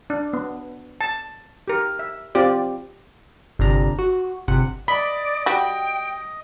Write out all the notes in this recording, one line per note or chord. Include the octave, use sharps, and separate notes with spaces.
D4
B3
A5
G4 A#4
E5
C4 F4 G4 D5
G1 C3 D4 A#5
F#4
G1 C3 F#5
D5 D#5 B5
G3 F#4 G5